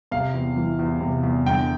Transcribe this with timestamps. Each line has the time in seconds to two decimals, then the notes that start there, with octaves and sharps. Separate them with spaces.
0.11 C3 F5
0.34 E2
0.56 E3
0.79 E2
1.01 C3
1.23 E2
1.46 D3 G5